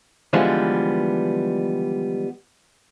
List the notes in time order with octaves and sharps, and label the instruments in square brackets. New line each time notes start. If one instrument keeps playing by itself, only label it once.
[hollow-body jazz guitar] D3 E3 F3 G3 G#3 B3